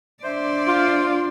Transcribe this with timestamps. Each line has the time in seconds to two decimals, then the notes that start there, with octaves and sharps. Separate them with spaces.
0.23 D4 C5 D5 E5 C6
0.68 F4